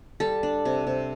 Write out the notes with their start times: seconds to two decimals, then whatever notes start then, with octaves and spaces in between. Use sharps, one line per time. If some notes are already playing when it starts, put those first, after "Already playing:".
0.20 G3 A4
0.43 D4
0.65 C3
0.87 C3